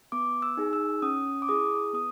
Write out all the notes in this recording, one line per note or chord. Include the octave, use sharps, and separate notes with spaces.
B3 D6
E6
D#4 G#4
E6
C#4 D#6
D6
E4 G#4 D#6
B3 D#6